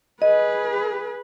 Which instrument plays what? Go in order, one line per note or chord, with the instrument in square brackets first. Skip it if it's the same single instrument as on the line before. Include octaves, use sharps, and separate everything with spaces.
[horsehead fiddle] G#4 B4 [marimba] D#5